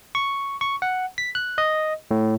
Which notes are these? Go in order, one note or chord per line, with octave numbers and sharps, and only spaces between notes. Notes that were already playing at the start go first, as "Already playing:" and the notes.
C#6
C#6
F#5
B6
F#6
D#5
A2